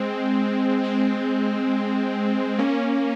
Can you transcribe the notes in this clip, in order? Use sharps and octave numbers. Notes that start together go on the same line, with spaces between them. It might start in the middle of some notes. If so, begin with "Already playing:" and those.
Already playing: G#3 C4
G#3 C4
A#3 C#4